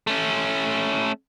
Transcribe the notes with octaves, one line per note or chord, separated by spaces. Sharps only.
A3 C#4